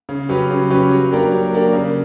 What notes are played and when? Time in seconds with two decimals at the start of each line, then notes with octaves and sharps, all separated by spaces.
0.09 C#3
0.29 F#3 C#4 G4 B4
0.50 C#3
0.70 F#3 C#4 G4 B4
0.91 F#3
1.12 A#3 D4 G4 A#4
1.32 F#3
1.53 A#3 D4 G4 A#4
1.73 C#3